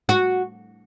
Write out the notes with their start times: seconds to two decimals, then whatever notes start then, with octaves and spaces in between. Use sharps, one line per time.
0.09 F#4